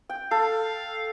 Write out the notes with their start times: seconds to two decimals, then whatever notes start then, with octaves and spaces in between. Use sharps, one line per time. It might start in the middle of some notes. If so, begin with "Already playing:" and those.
0.09 G5
0.31 A4 F5